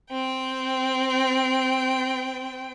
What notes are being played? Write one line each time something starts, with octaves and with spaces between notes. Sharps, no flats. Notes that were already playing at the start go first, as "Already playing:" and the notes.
C4 G5